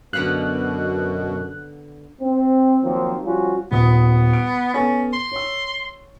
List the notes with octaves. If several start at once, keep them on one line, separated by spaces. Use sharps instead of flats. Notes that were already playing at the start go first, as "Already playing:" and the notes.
F#2 B2 D3 B3 F5 F#6
C4
D#3 F3 F#3 A#3 C4
F3 G3 C#4 F4 F#4
D#1 B3 D#6
D7
B3 C#4 A4 A6
C6
C#5 E6